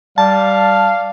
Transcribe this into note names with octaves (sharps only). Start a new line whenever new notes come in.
G3 F5 A5